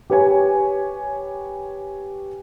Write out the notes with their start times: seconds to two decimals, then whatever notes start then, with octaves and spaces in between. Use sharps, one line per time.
0.10 G4 B4 C#5 G#5